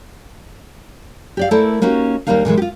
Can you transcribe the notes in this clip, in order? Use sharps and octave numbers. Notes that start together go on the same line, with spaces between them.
G4 D5 F5
A3 E4 A4 A#4 C5 D5
A#3 C#4 D#4 F#4 G4
D#2 G3 G#3 A#3 D#4 F5
A#2 D3 E3 G#3
F4 G4